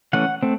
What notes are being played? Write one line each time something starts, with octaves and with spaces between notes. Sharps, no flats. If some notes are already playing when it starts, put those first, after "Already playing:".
E3 A3 C#4 F#5
A3 C4